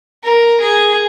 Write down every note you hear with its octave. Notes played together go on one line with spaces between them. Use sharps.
A#4
G#4